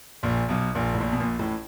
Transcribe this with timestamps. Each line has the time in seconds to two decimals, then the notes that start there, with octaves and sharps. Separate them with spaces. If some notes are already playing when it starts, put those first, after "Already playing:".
0.23 A#1 A#2
0.49 B1 B2
0.75 A#1 A#2
0.94 A2
1.00 A#1 A#2
1.12 B2
1.20 A#1 A#2
1.39 A1 A2